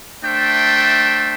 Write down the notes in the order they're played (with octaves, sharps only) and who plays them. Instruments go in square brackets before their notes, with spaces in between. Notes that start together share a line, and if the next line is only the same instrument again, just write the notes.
[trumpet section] A3 D4 C5 E5 G5